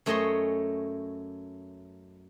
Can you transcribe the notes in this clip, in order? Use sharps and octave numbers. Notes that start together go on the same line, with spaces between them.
F#2 A3 C#5 D#5 G#5 C6